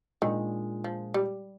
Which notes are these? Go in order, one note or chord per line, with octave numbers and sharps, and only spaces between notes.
A#2 D#3 G#3 D4
F3
G3